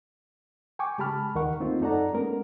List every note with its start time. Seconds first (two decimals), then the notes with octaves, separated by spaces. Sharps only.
0.79 G5 G#5 C#6 D6
0.98 C#3 G#3 G4 A5 B5 F6
1.35 D#2 D#3 D#4 A#4 F#5 C#6
1.60 A3 A#3 C4 D#4 F4
1.81 F#2 D#4 A4 D5 F#5 A#5
2.13 G#3 A#3 B3 C#4 A#4